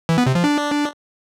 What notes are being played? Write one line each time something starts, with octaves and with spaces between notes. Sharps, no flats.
E3
B3
C3
F3
D4